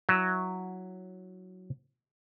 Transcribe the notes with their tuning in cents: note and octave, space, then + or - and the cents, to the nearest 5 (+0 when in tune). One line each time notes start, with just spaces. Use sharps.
F#3 +0 E4 +0